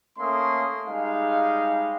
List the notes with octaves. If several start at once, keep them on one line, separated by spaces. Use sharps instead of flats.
A3 A#3 C#4 C6 D#6
G3 G#3 D#4 F5